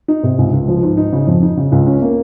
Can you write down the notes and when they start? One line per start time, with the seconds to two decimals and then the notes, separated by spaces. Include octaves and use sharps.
0.08 D#4
0.23 C3
0.39 C#2
0.53 C#2
0.68 F3
0.83 G#2
0.97 D#4
1.13 C#3
1.27 F2
1.42 D#4
1.57 C#3
1.72 C#2
1.87 C#4
2.02 A#3